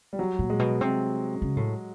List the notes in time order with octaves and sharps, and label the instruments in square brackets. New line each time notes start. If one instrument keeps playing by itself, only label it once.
[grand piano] G3
F#3
[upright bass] A#2
[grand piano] G#3
[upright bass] B2
C3
C#3
A2